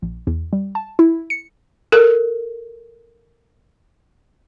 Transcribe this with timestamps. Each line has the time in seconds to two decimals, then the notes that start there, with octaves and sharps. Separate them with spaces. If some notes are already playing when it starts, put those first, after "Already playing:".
0.02 A#1
0.27 E2
0.53 G3
0.75 A5
0.99 E4
1.30 C#7
1.92 A4 A#4